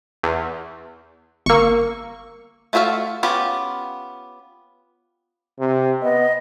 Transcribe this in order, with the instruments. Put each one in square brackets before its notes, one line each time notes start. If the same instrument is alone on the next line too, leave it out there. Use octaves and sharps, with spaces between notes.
[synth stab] E2
[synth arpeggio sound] G1 E6 [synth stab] A#3 C#6
[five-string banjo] A3 F4 F#4 E5 F5
B3 C#4 F4 G4
[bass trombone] C3
[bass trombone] B3 [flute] D#5